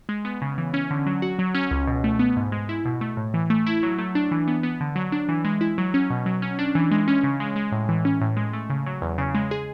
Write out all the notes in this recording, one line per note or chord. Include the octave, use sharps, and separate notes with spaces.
G#3
B3
C#3
E3
C#4
D3
F#3
F#4
F#3
C#4
C#2
B2
A3
B3
G#2
G#3
E4
B2
A3
A2
E3
A3
E4
F#3
A3
D4
E3
B3
B3
D3
F#3
D4
E3
G#3
E4
F#3
C#4
B2
F#3
C#4
D4
E3
G#3
C#4
C#3
G#3
G#3
A2
E3
C#4
A2
G#3
A3
C#3
F#3
E2
C#3
G#3
G#4